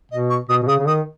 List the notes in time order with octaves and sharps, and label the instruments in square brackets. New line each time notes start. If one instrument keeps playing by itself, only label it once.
[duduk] B2 [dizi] D#5
[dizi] C#6
[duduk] B2 [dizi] D#6
[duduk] B2
[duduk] C#3 [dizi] D#6
[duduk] C#3
[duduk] D#3 [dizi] D#6